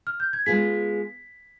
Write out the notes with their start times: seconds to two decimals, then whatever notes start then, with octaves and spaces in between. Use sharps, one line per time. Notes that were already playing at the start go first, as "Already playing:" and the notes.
0.07 F6
0.20 G6
0.33 G#6
0.46 G#3 B3 F4 G#4 B6